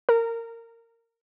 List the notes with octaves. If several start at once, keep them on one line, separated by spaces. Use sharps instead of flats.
A#4